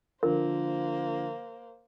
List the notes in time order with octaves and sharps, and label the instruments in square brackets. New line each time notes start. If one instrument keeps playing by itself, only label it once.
[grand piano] D3 F3 [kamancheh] A#3 C5 [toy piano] A#4